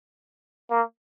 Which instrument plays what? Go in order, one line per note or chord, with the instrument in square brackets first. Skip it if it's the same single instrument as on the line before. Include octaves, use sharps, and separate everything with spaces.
[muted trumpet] A#3